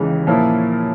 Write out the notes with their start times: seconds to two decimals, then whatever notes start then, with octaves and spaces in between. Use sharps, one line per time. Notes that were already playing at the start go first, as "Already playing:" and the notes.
Already playing: D#2 C#3 E3 G#3
0.27 A#2 F3 A#3 C#4 E4